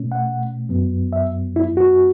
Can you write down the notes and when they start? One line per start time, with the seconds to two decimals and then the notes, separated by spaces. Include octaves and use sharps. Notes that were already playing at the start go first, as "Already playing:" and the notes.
Already playing: B2 A3 C#4
0.12 F#5
0.69 F#2 F#3 B3
1.13 E5
1.56 E4
1.77 F#4